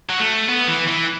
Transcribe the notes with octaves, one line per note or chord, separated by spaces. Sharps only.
F#3
A3
B3
E3
E3